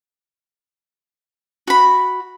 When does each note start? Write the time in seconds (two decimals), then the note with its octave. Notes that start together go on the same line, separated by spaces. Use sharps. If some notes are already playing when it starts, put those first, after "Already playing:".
1.67 F#4 B5